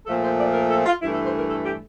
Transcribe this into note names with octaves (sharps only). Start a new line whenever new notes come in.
A#2 F3 A3 A4
C5
D5
A#4
A4
F4
G2 E3 A3 E4
A4
C5
A#4
A4
G4